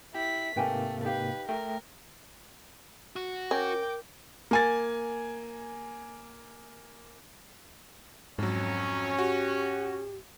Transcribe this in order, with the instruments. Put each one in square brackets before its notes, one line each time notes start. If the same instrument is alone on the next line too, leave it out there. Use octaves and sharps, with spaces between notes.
[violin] E4 B6 [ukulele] G4
[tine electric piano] G#2 C3 A#3 [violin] A3 [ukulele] B4 G5 G#5
[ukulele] D#4 G4 F5 [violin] B4
[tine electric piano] A3 G5 [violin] A#4
[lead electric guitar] F#4
[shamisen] C#4 [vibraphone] A#4 [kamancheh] G5 D6
[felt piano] A#3 G#5 A6
[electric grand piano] F2 F#3 [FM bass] G#2 [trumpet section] C#4
[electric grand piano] F#4 [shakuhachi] G4